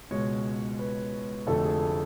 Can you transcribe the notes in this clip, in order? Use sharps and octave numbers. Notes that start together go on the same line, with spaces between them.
C#2 B2 G#3 C#5
B4
F1 F2 D3 F#3 A3 A4
G#4